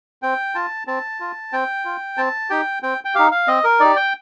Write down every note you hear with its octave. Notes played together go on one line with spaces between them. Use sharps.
C4 G5
F4 A5
C4 A5
F4
C4 G5
F4
C4 A5
D#4 G4 G5
C4 G5
G5
D#4 G4 F5
F5
C4 D#5
A#4
D#4 G4 D5
G5